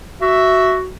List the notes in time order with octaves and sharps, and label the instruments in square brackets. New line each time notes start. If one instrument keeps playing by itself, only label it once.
[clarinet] F#4 [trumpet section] E5